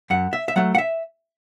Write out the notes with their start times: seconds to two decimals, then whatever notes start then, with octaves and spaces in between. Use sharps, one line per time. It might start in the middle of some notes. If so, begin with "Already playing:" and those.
0.10 F#2 F#5
0.33 E5
0.48 E5
0.56 F#3 A3 F#5
0.75 F#5
0.78 E5